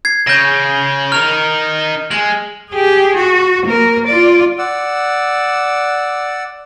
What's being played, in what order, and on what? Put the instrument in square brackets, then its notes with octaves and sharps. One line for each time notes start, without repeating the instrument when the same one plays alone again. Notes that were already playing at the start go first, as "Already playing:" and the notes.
[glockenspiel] G#6 C7
[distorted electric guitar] C#3 [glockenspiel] G6 A#6
[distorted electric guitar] D#4 A#4 [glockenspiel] F6 F7
[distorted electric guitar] G#3 [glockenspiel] F#7
[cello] G4 G#4
F#4
A#3 A#4
F4 D5
[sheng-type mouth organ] D5 F#5 E6